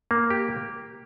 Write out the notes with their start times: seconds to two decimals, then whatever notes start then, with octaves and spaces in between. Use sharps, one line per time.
0.11 A#3
0.30 G4